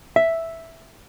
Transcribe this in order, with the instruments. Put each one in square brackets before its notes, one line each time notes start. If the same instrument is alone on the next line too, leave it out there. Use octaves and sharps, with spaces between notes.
[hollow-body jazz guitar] E5